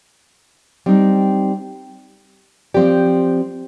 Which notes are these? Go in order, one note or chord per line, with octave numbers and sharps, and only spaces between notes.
G3 C4 D#4
F3 C4 G4 D5